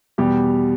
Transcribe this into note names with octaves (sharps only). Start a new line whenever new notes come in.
E2 B2 G3 G4